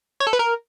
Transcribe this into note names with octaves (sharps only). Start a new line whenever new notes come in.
C#5
A4
B4
A#4